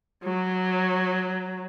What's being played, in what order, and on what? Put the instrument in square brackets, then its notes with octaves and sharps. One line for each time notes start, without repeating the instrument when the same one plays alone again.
[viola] F#3